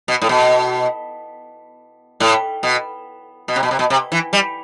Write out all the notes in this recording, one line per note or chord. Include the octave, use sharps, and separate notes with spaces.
B2
A2
B2
A2
B2
B2
C3
B2
C3
B2
C3
E3
G3